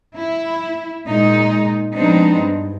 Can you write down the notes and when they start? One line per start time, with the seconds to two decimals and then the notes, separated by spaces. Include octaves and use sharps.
0.17 E4
1.07 A#2 G#3 D#4
1.95 F3 G#3 B3 C4 D4 D#4
2.39 G2